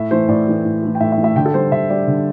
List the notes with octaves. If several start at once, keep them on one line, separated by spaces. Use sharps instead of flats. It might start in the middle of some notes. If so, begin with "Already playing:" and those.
Already playing: A2 E5
E3 A3 C5
A2 D5
E3 A3
A2
E3 A3
G5
A2 E5
E5
E3
A3 E5
D3 G5
A4
G3 C5
D3 E5
G3 D5
D3